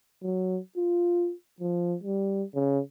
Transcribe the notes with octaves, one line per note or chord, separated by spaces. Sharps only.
F#3
F4
F3
G3
C#3